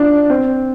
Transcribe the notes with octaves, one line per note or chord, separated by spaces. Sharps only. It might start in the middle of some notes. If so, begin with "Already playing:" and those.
Already playing: D4 F4
C4